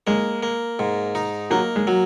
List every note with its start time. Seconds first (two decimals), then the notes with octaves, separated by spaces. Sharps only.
0.07 G#3 A#3
0.43 A#3
0.79 G#2
1.15 D#4
1.51 F#3 A#3
1.76 G#3
1.87 F#3